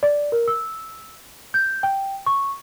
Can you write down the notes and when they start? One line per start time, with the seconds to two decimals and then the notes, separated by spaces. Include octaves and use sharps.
0.03 D5
0.32 A#4
0.48 E6
1.54 G6
1.83 G5
2.26 C#6